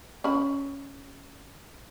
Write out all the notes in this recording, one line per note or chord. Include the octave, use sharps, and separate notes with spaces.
C#4 B5